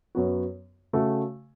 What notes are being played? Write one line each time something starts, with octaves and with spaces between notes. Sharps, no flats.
F#2 F#3 B3 F#4
C#3 A3 F#4